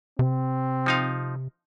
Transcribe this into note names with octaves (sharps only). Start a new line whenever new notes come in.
C3 C4
F3 D#4 F5